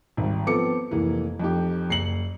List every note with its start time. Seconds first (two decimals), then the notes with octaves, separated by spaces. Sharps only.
0.17 G#1 G3
0.46 F3 B3 C4 A4 D6 C#7
0.91 F1 E3 A#3
1.40 F2 D#4 G4
1.89 F#1 C7 C#7 F#7